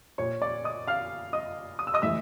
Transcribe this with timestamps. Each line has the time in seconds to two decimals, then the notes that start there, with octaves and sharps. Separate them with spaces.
0.18 A#2 C#5 C#6
0.42 D5 D6
0.64 D#5 D#6
0.87 F5 F6
1.33 D#5 D#6
1.79 D#6
1.87 E6
1.94 D#5 D#6
2.02 A2 E3 E5 E6